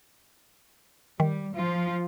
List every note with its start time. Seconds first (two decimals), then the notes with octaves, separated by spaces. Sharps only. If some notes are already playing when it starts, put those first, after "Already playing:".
1.20 D#3 G3
1.55 F3 F4